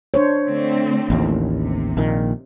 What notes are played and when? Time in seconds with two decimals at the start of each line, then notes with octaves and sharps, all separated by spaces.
0.14 D4 C5 C#5
0.45 D3 A3 C4
1.10 A1 D#2
1.57 C3
1.97 A#1 A#2 D#3